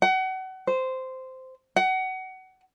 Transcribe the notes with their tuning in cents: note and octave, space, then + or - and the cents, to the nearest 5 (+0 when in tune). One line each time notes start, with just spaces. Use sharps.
F#5 +30
C5 -10
F#5 +25